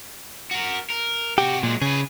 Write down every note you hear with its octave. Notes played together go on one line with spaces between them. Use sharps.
F#4 A#4
A#4
C3 F#4 G4
A#2 F#3 G#3
C#3 G#4 B4